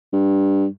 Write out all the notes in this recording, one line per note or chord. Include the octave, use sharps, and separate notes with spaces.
G2